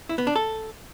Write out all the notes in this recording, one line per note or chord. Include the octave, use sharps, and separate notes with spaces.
E4
B3
D4
A4